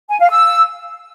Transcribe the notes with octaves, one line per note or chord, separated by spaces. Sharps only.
G#5
F5
E6